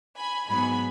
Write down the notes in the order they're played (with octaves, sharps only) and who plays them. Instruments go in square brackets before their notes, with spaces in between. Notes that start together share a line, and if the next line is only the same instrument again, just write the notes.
[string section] G#5 B5
G#2 F#3 B3 G#5 B5